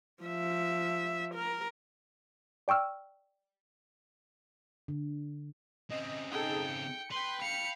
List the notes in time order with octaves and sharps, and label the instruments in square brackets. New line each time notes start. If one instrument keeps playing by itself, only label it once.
[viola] F3 E5
A#4
[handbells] D5 G5 C#6 E6 F6
[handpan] D3
[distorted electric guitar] C#3 C4 [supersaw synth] D#5
[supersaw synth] D#4 G#4 A4 [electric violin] G5
[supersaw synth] C#7
[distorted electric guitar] B4 [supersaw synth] G5 B5 [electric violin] C6
[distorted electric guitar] F5 [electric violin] C#7